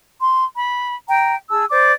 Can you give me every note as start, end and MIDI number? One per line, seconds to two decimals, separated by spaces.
0.21 0.44 84
0.56 0.95 83
1.09 1.36 79
1.09 1.36 82
1.49 1.65 68
1.49 1.65 81
1.49 1.65 88
1.70 1.92 72
1.70 1.92 74
1.70 1.92 86